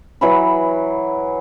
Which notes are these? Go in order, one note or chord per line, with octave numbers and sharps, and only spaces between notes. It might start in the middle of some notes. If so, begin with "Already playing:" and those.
E3 F#3 B5